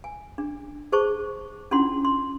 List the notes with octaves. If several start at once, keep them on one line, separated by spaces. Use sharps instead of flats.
G#5
D4
G#4 C5 A5 C#6
C#4 D4 E4 F4 F#5 C6
C6